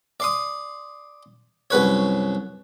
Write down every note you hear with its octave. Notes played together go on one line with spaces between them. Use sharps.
D5 C6 D#6
C2 F#2 B4 C#5